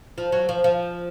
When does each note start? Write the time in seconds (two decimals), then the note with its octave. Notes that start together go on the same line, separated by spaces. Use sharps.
0.18 F3
0.32 F#3
0.49 F3
0.64 F3